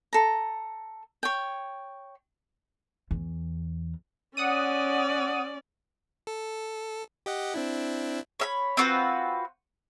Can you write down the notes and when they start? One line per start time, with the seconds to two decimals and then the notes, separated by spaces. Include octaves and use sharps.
0.13 A4 A#5
1.23 C#5 G5
3.11 E2
4.37 C#4 D5 F#5 D#6 D#7
6.27 A4
7.26 G4 D#5 F#5
7.54 C4 D4 E4
8.40 C#5 E5 B5
8.77 C4 F4 F#4 B4